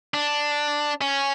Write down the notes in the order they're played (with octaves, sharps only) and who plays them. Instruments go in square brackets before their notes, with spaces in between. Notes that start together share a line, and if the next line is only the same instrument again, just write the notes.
[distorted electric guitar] D4
C#4